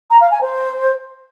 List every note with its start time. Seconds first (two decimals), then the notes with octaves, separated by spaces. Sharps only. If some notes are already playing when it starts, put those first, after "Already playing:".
0.10 A#5
0.20 F5
0.30 G#5
0.41 C5